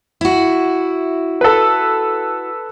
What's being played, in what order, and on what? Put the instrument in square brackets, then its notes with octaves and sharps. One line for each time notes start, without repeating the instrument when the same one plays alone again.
[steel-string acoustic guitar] E4 F#4
[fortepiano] A4 B4